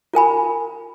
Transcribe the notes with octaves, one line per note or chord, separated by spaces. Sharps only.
F4 A#4 G#5 B5